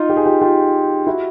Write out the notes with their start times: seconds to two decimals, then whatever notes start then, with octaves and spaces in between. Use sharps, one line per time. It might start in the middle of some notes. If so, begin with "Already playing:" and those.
Already playing: D#4 F4
0.09 G4
0.16 G#4
0.25 F4 G4
0.41 F4 G4
1.07 E4 F#4